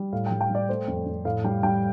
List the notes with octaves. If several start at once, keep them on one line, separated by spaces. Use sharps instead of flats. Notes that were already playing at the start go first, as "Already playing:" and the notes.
Already playing: G3
A2 F5
G3 G5
G5
G3 D5
A3 C5
F2
F2
A2 F5
G3 G5
G3 G5